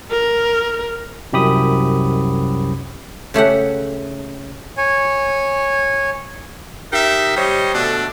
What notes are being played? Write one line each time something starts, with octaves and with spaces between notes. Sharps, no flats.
A#4
C2 F#2 G4 B5 D#6
C#3 A3 G4 F#5
C#5 G#5
D#4 G4 A#4 E5
G3 C5 C#5 D#5
B2 D3 A3 D4